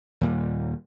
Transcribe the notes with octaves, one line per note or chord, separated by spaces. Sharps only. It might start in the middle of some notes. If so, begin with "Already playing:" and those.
D#2 A#2 G3